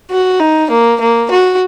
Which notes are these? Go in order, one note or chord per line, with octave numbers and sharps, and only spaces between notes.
F#4
D#4
A#3
A#3
F#4